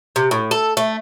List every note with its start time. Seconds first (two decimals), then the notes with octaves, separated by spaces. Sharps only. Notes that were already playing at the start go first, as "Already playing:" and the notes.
0.16 C3
0.31 A2
0.51 A4
0.77 A3